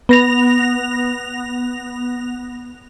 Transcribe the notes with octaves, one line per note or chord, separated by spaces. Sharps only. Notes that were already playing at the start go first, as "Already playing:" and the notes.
B3 A#6 F7